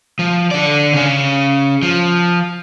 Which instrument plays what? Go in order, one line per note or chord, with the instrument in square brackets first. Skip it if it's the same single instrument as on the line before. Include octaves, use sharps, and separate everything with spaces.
[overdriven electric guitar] F3
D3 D5
C#3 C#4
F3